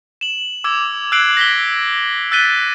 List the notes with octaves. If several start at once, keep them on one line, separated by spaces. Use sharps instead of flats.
E7 F#7
D6 E6 G#6 E7
E6 F#6 G#6 C7 D7 F#7
A#6 B6 G7
E6 F#6 A6 B6 D#7 G7